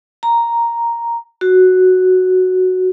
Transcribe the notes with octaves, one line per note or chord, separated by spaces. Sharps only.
A#5
F#4